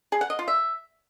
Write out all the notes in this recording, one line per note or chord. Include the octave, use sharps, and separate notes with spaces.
G#4
F#5
D#5
F4
E5